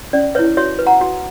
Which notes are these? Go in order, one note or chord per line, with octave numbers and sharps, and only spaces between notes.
C#4 D5
E4 B4 C#5 E5
F#4 C#5 E5
B4
F#5 A#5
F#4